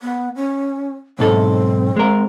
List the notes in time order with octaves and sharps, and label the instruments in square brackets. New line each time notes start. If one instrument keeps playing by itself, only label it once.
[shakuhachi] B3
C#4
[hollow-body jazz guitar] B1 G#2 A4 [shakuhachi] C4
[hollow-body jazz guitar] G#3 A#4